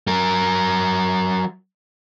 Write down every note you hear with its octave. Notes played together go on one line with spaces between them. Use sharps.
F#3 A#4